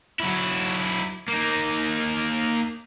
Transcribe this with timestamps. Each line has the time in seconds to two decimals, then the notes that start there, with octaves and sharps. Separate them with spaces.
0.20 F#3 E4
1.29 A#3 D#4